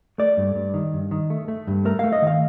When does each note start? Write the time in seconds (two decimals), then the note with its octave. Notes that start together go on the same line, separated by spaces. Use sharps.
0.18 A3 D5
0.37 G2
0.55 G2
0.74 D#3
0.93 G2
1.11 D#3
1.30 A3
1.48 A3
1.67 G2
1.85 A3 A#4
1.99 A3 F5
2.13 D#5
2.22 D#3 F5